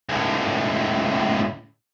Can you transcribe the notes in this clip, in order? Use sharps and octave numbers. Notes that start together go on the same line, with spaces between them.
C#2 A2